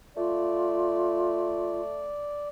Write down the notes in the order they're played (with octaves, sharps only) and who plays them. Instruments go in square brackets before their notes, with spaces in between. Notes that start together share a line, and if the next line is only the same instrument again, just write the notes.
[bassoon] A3 [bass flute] F4 [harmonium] D5